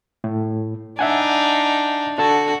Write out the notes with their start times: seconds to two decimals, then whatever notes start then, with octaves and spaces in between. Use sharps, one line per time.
0.24 A2
0.99 D4 D#4 E5 F#5 G#5
2.18 D4 F#4 A4 A5